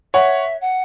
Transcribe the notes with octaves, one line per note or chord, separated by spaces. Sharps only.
C#5 E5 F#5
F#5